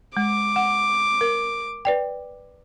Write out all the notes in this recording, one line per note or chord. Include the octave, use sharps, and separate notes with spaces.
G#3 D6
F#5
A#4
B4 D5 G5